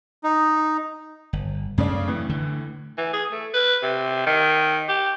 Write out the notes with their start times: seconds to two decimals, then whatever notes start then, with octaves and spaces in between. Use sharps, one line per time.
0.24 D#4
1.33 G1
1.78 F#2 C#3 A3 D4
2.07 A2 E3
2.29 D3
2.98 E3
3.13 G#4
3.32 A3
3.54 B4
3.83 C3
4.27 D#3
4.89 G4